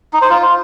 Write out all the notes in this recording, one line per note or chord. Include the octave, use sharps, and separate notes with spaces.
D#4
C5
F4